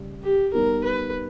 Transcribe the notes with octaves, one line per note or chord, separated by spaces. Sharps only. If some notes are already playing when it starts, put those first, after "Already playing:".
Already playing: C#3 G3
G4
G3 B3 D#4 G4 A#4
B4